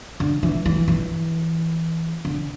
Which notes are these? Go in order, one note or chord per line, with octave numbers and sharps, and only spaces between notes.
D3
E3
E3
E3
D3